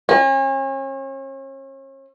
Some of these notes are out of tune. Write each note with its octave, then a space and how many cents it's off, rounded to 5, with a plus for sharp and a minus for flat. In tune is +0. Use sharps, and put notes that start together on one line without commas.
C#4 -40